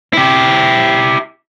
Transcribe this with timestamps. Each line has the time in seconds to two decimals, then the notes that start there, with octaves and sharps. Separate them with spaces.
0.13 E4 G4